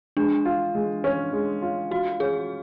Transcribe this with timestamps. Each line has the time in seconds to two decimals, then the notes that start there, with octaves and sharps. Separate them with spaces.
0.17 G#3 D4
0.45 F4
0.75 G#3
1.04 C#4
1.33 G#3
1.62 F4
1.91 F4 F#4
2.20 C#4 G#4